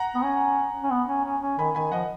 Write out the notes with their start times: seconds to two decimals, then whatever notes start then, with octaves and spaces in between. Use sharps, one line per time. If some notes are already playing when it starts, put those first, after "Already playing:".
Already playing: F#5 A#5
0.15 B3
0.22 C#4
0.83 C#4
0.91 B3
1.08 C#4
1.25 C#4
1.42 C#4
1.58 D#3 G#5 B5
1.75 D#3 G#5 B5
1.92 F3 D#5 F#5